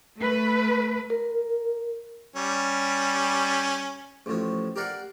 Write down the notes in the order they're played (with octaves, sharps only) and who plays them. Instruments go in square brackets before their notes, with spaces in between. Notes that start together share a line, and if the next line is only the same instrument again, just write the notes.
[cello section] A3 B4
[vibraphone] A#4
[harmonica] G3 C#4
[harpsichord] A1 A2 F3
G4 A#4 D5 F5 F#5